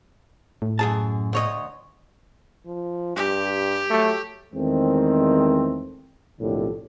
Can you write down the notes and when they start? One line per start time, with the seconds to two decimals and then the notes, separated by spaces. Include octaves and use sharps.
0.62 A2
0.79 F#2 G#4 A5
1.33 D2 C#5 D#5
2.66 F3
3.16 G2 G4
3.90 F#3 A3
4.54 E2 D#3 G#3 A3 C4
6.40 B1 F2 A2 D3 D#3 G4